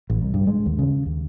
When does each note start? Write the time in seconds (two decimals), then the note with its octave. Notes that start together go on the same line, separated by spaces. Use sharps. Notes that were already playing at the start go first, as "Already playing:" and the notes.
0.10 A1
0.21 C2
0.34 G2
0.47 G#3
0.66 D#2
0.79 C#3
1.06 D#2